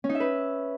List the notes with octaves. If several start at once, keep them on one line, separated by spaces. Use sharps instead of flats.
C#4
D#4
E5
B4